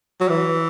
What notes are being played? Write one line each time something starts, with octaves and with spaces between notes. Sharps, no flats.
F#3
E3